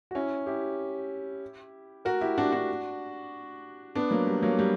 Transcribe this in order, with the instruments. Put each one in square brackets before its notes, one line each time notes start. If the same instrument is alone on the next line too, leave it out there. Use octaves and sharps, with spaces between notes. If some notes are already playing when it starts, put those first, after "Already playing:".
[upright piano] F#4
C#4 E4
E4 G4
F#4 A#4
E4 G4
D4 F#4
D4 F#4
B3 D4
F#3 A#3
G3
F#3 A#3
G3